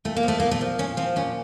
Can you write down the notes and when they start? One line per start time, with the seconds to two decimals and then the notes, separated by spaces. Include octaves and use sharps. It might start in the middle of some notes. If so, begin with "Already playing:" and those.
0.05 A#2 A3
0.17 A#3
0.23 F3 A3
0.40 A#2 A#3
0.51 A3
0.61 F3
0.78 A#2 C#4
0.97 F3 C4
1.16 A#2 C#4